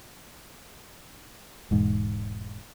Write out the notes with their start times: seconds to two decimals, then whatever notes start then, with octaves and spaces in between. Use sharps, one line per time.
1.71 E1 G#2